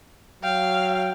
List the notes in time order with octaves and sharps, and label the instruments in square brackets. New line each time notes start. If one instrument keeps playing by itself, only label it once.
[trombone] F#3 [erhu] F5 [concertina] G5